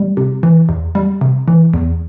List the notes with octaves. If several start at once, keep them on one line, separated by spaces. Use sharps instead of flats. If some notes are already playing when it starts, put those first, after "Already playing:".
Already playing: G3
C3
E3
E2
G3
C3
E3
E2